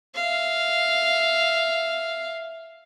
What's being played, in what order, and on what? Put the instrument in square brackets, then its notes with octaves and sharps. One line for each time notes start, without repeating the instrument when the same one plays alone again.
[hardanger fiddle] E5 F5